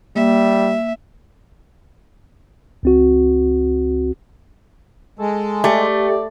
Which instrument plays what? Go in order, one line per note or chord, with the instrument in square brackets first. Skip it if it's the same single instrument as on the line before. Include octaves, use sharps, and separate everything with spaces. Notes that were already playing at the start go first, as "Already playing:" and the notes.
[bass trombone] G3 [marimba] A#3 [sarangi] E5
[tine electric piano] C#2 C4 F#4
[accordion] G#3 [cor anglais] A4
[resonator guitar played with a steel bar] A3 [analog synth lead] G4 [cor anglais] D5